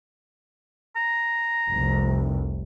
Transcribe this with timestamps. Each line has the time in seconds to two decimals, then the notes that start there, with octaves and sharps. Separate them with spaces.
0.96 A#5
1.69 F1 C2